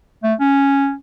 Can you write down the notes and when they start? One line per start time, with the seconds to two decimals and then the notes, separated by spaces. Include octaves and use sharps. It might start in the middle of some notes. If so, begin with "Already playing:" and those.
0.23 A3
0.40 C#4